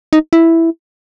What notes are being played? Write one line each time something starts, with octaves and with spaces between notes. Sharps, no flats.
D#4
E4